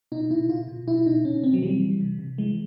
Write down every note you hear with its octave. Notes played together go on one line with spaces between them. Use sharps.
B2 D#4
B2 E4
B2 F4
B2
B2 E4
B2 D#4
B2 C#4
B2 C4
F#3
E3 G3
E3
C3
C3
E3 G#3